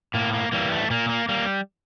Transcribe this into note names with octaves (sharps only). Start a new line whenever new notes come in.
A2 A#3
A#3
E3 G3 A#3
A3
A#2 A#3
A#3
G3 A#3